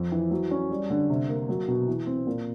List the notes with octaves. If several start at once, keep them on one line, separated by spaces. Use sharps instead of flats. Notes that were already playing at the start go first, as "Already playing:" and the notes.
Already playing: F2
E3
F#3
C#4
G3
D3
C3
A#3
F#3
B2
E3
C4
A#2